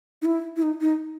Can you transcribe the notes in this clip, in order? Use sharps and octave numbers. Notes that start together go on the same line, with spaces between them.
D#4
E4
E4
D#4
D#4